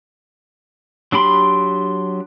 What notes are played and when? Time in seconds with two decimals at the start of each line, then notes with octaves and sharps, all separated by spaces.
1.12 F#3 D4 G4 B5 C6